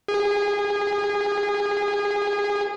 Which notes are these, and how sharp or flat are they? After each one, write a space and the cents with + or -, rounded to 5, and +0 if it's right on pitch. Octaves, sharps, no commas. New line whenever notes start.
G#4 -25